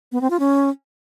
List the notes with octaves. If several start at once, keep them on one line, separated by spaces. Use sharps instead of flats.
B3
C4
F4
C#4